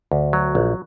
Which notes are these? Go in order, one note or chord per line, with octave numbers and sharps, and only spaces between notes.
D2
F#3
A#1